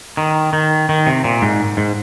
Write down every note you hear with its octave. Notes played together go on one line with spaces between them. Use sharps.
D#3
D#3
D#3
C3
A#2
G#2
G#2